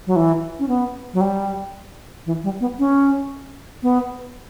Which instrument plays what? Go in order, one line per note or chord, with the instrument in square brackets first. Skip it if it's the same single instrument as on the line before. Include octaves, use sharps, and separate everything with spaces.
[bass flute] F#3
E3
C#4
B3
F#3
G3
E3
G3
B3
C#4
B3